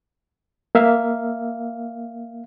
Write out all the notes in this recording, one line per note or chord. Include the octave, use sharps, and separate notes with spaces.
A#3 E5 F5